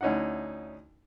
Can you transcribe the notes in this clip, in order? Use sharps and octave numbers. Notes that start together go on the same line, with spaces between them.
D2 C#4 D#4 E4 F#5